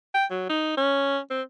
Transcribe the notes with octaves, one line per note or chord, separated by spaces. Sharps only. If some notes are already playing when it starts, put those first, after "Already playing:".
G5
F#3
D#4
C#4
C4